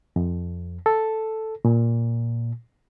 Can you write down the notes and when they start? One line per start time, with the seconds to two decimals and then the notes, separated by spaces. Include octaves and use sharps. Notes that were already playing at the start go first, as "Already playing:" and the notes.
0.16 F2
0.86 A4
1.65 A#2